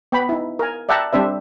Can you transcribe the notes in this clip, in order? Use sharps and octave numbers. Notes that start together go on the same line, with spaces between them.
B3 G5 B5
D#4 E4
A#4 G#5
D5 E5 F#5 G5 A5 A#5
G3 C4 D4 C5 E5